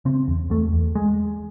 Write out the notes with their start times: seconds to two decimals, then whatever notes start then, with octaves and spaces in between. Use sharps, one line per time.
0.05 C#3 C4
0.28 E2
0.50 E2 A3
0.73 E2
0.95 G#3